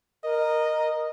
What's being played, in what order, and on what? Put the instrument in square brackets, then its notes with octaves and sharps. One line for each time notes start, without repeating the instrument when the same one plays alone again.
[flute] A#4 [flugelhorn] D#5